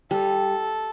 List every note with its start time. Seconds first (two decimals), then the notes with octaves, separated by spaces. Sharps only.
0.11 G3 A4